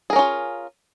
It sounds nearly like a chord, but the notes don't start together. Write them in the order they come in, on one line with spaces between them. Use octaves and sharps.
G#4 A#4 C#4 F4